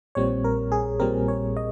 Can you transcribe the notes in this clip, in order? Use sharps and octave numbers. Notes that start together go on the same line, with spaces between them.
A#1 A#2 G3 C4 C#5
A#4
G#4
A#1 A#2 G3 C4 A#4
C#5
D#5